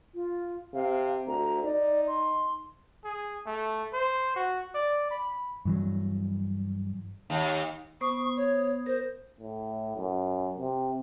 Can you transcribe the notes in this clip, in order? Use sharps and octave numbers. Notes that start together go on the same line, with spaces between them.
F4
C3 F5
D2 A#5
D#4 D5
C6
G#4
A3
C5
F#4
D5
B5
G2 E3 F#3
D#2
B3 C5 C#6 D#6
C#5
A#4 C5
A2
F#2
C3